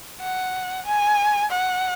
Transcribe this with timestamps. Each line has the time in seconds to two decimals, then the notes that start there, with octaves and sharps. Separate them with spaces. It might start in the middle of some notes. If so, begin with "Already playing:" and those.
0.21 F#5
0.86 G#5
1.51 F#5